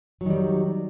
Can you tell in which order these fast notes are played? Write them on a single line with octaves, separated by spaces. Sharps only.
F#3 D#3 G3